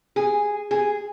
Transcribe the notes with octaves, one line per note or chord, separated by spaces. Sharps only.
G#4
G#4